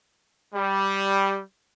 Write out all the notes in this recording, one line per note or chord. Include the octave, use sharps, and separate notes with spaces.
G3